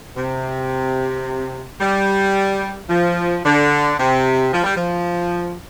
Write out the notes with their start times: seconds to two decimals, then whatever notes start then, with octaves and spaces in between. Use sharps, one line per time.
0.17 C3
1.81 G3
2.89 F3
3.44 D3
3.99 C3
4.53 F3
4.64 G3
4.76 F3